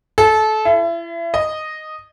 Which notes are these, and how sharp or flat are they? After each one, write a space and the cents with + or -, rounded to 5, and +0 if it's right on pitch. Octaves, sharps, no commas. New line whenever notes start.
A4 -25
E4 +35
D#5 -5